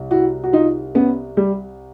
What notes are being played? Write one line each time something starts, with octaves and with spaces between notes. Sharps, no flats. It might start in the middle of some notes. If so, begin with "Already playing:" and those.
Already playing: C2
E4 F#4
F#4
D#4 F4
B3 C#4
G3